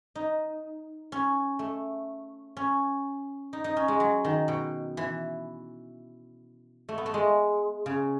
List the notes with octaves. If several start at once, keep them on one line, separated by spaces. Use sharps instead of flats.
D#4
C#4
A3
C#4
D#4
D#4
C#4
G#3
F#3
D#3
B2
E3
A3
B3
A3
G#3
C#3